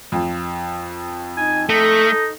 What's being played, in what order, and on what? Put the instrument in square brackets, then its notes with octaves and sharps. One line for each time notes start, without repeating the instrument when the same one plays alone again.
[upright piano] F2
[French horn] D#4 [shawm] G#5
[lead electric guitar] A3 [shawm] D#4 [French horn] A4